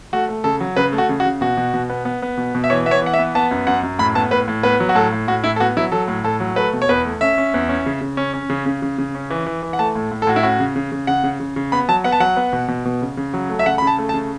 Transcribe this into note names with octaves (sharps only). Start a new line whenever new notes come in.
A3 F#4
A3
C#3 A4
F#3
C#3 B4
A3
F#4
C#3
F#4
C#3
B2 F#4
B2
B2
B3
B3
B3
B2
B2
E5
E3 C#5
B3 E5
C#5
E3 F#5
E5
B3
B3 A5
F#2
F#2 F#5
F#2
A2 B5
B3 A5
A2 B4
A2
B3 B4
F#3
F#4
A2 A4
A2
A2 F#4
A2 E4
A4
B3 F#4
F#3 E4
F#3 A4
A2
A2 A4
F#3
A3 B4
B2
C#5
E2 B4
A3
C#4 E5
C#4
E2
C#4
C#3
C#3
C#4
C#4
C#3
C#3
C#3
C#3
C#4
E3
E3
E3
F#5
A3 A5
A2
A2
A4
A2 F#4
E4
C#4 F#4
C#3
C#3
C#3
C#3 F#5
C#3
C#3
C#3
B3 B5
F#3 A5
B3 F#5
A5
F#3 F#5
B3
B2
B2
B2
C#3
C#3
F#3
A3
E5
C#3 F#5
B5
C#3 A5
A3
A5
C#3